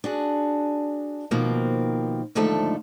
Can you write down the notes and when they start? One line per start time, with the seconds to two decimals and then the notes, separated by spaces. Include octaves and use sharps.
0.04 D4 F#4 G#4
1.31 B2 D#3 F3 A#3 C4
2.35 D#2 G#2 D3 F3 A3 A4